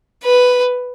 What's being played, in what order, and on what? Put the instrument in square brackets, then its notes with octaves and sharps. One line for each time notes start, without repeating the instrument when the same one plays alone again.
[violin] B4